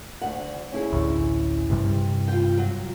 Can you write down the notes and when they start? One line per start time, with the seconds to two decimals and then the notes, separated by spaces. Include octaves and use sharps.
0.22 D2 F#5
0.72 C#4 E4 G#4
0.93 A1 D2
1.69 G2 C3 G3
2.28 F4 G5
2.58 F#3